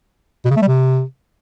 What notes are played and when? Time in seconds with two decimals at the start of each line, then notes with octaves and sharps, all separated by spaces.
0.45 B2
0.50 C#3
0.56 A3
0.62 G3
0.68 C3